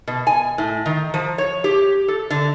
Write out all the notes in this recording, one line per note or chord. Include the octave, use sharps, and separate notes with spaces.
B2
G#5
A2
D#3
F3
C#5
G4
A4
D3